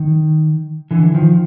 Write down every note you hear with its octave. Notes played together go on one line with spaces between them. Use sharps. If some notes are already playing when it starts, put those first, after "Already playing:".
Already playing: D#3
D3 E3
D#3 F3